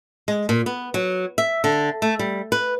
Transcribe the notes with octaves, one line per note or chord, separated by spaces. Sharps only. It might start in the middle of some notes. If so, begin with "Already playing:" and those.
G#3
A#2
B3
F#3
E5
D3
A3
G3
B4